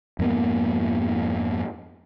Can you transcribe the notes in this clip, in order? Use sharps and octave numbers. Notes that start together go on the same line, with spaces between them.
F2 G#2 A#3 B3